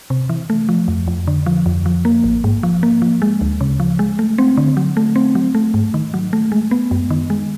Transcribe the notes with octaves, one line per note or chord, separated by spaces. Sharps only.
C3
E3
A3
F3
F2
F2
D3
F3
F2
F3
A#3
A1
G#2
F3
A#3
F3
G#3
D2
C#3
F3
G#3
A3
C4
D3
F#3
A3
C4
F#3
A3
G#2
D#3
F#3
A3
G#3
B3
F#2
D#3
G#3